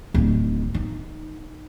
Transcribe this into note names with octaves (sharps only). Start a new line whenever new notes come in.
D1 D#3
D#4